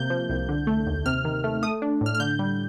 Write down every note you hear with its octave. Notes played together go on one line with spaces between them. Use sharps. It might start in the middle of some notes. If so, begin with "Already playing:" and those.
Already playing: C3 A#3 G6
F3
C2
D3
A3
D#2
C3 F6
D#3
A3
A3 D#6
D4
A2 F6
F6
D3 G6
G3